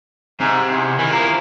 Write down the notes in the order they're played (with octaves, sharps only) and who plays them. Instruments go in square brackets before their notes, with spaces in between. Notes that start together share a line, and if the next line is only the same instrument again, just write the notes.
[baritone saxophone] G#2 [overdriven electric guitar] C3
[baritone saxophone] E2
[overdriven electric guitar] D#3 [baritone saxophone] E3
[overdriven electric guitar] F3 E4 [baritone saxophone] A#3